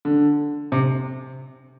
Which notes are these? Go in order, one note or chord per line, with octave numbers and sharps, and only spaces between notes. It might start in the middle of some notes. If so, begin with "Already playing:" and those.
D3
C3